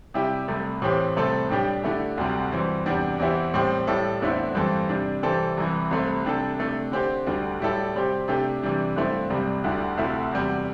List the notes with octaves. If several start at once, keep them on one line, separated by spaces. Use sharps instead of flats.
C3 G3 E4 G4
C2 C3 A3
A2 E3 C4 G4
C2 C3 A3 C4 A4
A2 G3 D4 G4
D3 A3 E4 G4
D2 C3 G3
G2 E3 C4
E2 C3 G3 D4
E2 E3 C4 E4 G4
A2 G3 C4 G4
A2 G3 E4 A4
E2 D3 A3 C4 E4
G2 E3 G3 C4 A4
C3 G3 D4
C3 E3 G3 C4 A4
C2 C3 E3
C2 C3 A3 C4
C3 G3 D4 A4
C3 A3 D4
D3 C4 G4
D2 D3 G3
A2 G3 E4 A4
C3 G3 C4 G4
C3 A3 D4 G4
C3 E3 G3 D4
G2 D3 A3 C4 E4
C2 C3 G3
D2 D3 G3 E4
D2 C3 A3 E4
E2 C3 G3